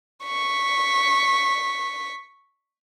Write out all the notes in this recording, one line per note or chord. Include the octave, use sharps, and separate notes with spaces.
C#6 B6